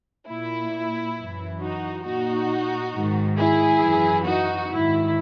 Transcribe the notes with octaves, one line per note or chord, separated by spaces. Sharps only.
A#2 E4
F#2 E3
D#4 F#4
A#2 D#4 F#4
G#2 D#3
E4 G#4
F#2 E3
D#4 F#4
G#2 D#3 E4